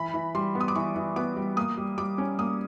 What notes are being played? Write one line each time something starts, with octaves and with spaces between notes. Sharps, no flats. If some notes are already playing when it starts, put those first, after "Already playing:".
Already playing: E3 B5
E3
G3 C6
B3
D#6
D6
E3 C#6
E3
B3 D6
G3
A#3 D#6
G3
G3 D6
C#4
A#3 D#6